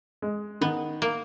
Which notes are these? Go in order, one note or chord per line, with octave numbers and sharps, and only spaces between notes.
G#3
D#3 B3
A#3